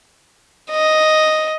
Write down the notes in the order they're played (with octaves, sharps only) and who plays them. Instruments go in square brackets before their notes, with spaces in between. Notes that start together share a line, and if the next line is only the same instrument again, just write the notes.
[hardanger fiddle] D#5